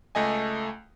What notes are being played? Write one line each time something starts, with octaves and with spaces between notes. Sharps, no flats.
C#2 A3 D#5 G#5